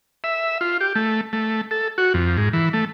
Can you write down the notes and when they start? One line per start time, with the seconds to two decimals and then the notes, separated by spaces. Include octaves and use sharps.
0.24 E5
0.61 F4
0.81 G4
0.95 A3
1.33 A3
1.71 A4
1.98 F#4
2.14 F2
2.38 G#2
2.53 E3
2.73 A3